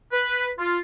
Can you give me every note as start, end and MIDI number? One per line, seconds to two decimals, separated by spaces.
0.12 0.49 71
0.59 0.79 65